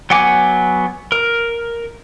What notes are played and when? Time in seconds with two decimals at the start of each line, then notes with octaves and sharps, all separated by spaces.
0.10 F#3 B3 F#5 G#5 D6
1.12 A#4